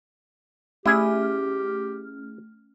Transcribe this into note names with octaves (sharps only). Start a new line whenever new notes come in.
A3 C#4 E4 G4 G#4 F6